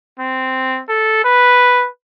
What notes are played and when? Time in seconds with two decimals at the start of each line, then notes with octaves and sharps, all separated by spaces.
0.19 C4
0.89 A4
1.24 B4